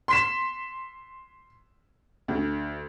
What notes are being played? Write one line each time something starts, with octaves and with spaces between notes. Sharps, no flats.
C6 B6 E7
D2